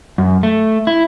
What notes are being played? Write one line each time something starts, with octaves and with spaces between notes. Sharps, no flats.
F#2
A3
E4